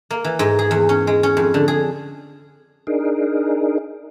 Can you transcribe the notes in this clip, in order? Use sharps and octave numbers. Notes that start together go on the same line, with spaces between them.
A#3
E3
G#2
G#4
E2
C#4
G#3
C#4
F2
D3
G#4
D4 D#4 G#4 A#4